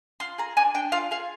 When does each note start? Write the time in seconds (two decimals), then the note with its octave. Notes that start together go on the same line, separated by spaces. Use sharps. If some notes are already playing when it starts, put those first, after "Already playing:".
0.20 F4 C6
0.38 G#4 A#5
0.57 D4 G#5
0.74 D4 G5
0.92 F4 F5
1.11 G#4 F5